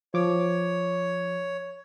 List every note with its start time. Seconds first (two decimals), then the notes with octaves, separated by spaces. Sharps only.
0.14 F3 C#5 D6